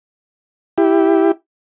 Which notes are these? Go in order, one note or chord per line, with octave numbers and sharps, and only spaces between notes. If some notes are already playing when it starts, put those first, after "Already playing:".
E4 G4